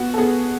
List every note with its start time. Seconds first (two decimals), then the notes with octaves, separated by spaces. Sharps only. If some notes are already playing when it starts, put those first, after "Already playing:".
Already playing: B3 F#4
0.14 A4
0.18 B3 G#4